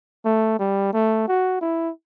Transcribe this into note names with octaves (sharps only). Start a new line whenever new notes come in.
A3
G3
A3
F#4
E4